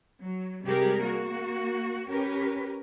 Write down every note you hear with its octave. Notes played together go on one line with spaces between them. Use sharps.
F#3
C3 G3 G#3 G4 G#4 A#4
A#3 F#4
C#4 G4 A#4 B4